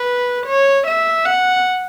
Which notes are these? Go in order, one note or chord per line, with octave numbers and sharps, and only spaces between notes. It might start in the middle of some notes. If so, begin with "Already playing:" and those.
Already playing: B4
C#5
E5
F#5